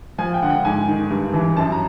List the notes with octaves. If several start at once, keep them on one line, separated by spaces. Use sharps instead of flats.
F3 G#5
G5
D3 F#5
G5
G#2 G#5
D#3
G2
E3
F#2 A5
A#5